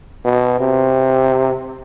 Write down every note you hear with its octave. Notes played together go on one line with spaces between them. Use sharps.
B2
C3